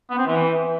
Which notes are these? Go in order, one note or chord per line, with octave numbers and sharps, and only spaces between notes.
B3
C4
E3